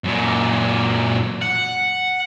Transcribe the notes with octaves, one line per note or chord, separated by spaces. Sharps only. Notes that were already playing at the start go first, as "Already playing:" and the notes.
F#2 A#2
F#5